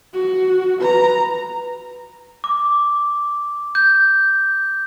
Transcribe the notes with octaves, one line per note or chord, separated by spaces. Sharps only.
F#4
B4 A#5
D6
G6